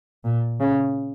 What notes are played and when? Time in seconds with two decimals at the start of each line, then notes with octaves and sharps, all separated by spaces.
0.24 A#2
0.60 C#3